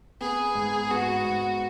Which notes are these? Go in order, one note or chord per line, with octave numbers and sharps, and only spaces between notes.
B3 G#4
G#2
B3 F#4
G#2